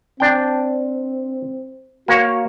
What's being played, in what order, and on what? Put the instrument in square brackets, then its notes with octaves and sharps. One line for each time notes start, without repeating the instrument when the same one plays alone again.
[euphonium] C4 [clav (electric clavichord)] D4 G5
[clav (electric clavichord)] A#3 C#5 [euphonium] F#4